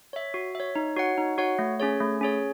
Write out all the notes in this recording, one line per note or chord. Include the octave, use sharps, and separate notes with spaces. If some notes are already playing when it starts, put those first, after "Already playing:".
C#5 E5
F#4
C#5 E5
D#4
F#4 C#5 F#5
D#4
F#4 C#5 F#5
A3
C#4 G#4 C#5
A3
C#4 G#4 C#5